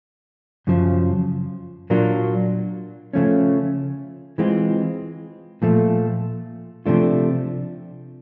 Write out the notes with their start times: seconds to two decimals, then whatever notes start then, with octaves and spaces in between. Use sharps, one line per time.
0.67 F#2 C#3 F3
1.90 A#2 F#3 A#3 D4 F4
3.13 C#3 F3 A3 C#4
4.38 E3 G#3 C4 F4
5.62 A#2 F3 A3
6.86 C3 F3 A3 D4 F4